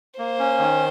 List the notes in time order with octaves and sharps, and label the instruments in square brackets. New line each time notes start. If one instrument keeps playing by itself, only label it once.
[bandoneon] A#3 [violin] C5
[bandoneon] C#4
D#3